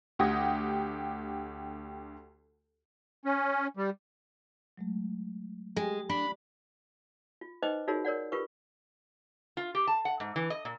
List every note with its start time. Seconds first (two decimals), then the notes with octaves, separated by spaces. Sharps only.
0.19 D2 G4 F#5 D#6 G#6 A#6
3.25 C#4
3.77 G3
4.77 F#3 G#3 A3
5.76 G#3 G4 G5 G#5
6.09 D4 D5 B5
7.41 F4
7.62 D#4 B4 C5 D#5 G5 D6
7.88 D#4 F4 F#4 G#4 A#4 C#5
8.05 A#4 C#5 D5 F#5
8.32 F4 G4 A#4 B4 C#6
9.57 F4
9.75 G4
9.87 A5
10.05 F#5
10.20 G#2
10.36 E3
10.50 D#5
10.65 A#2